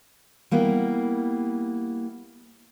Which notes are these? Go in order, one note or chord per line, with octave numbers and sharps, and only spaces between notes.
G3 A#3 B3 E4